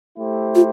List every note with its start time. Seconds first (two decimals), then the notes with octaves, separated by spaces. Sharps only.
0.18 A3 E4 G4 C5
0.55 F4